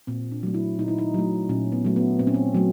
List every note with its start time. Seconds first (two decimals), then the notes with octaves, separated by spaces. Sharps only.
0.07 A#2 C4
0.32 D4
0.43 F#3 A3
0.54 E4
0.79 A#2 D#4
0.88 E4
0.98 D#4
1.14 F#3 A3
1.49 A#2 C#4
1.72 B3
1.85 F#3 A3
1.96 B3
2.19 A#2 C4
2.27 C#4
2.34 C4
2.55 F#3 A3